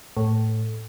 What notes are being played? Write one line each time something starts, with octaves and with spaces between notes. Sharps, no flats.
A2